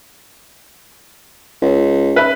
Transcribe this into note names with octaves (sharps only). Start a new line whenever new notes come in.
C#2
B4 E5